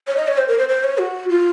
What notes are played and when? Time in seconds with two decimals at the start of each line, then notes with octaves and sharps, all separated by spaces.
0.07 C#5
0.17 D#5
0.28 C#5
0.38 C5
0.48 A#4
0.58 C5
0.69 C5
0.84 C#5
0.98 F#4
1.29 F4